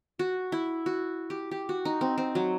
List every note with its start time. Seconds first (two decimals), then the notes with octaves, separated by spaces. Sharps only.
0.19 F#4
0.52 E4
0.86 F#4
1.30 G4
1.51 G4
1.69 F#4
1.85 D#4
2.01 C4
2.18 C4
2.35 F#3